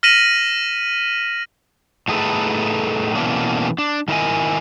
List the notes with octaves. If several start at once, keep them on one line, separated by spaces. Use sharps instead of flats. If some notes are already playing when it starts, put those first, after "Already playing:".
F6 A#6 B6 D#7 E7 F#7
A2 A3 D#4 G#4 A4 B4
B2 E3 A3 A#3 C#4 D4
D4
D#3 E4 A#4 D#5 G#5